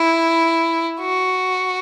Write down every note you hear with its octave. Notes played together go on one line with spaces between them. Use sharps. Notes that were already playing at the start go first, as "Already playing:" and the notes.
Already playing: E4
F#4